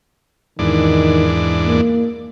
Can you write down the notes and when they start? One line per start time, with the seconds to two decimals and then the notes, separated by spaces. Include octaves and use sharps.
0.59 E2 G#2 D#3 D4
1.65 A#3